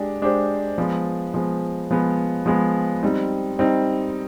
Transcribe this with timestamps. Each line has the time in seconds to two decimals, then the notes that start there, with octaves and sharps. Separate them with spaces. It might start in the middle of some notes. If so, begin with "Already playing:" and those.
Already playing: G#3 D4 G4
0.22 G#3 D4 G4 C5
0.78 F3 G#3 B3
1.34 F3 G#3 B3
1.91 F3 G#3 B3
2.46 F3 G#3 B3
3.03 G3 C4 D#4
3.59 G3 C4 D#4